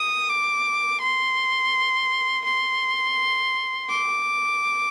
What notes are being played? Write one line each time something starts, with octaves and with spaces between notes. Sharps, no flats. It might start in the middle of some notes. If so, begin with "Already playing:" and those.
Already playing: D#6
D6
C6
C6
D6